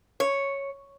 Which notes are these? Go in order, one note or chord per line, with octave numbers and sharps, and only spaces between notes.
C#5